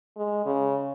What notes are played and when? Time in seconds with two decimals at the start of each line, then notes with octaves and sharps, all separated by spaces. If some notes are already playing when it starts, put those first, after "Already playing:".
0.17 G#3
0.46 C#3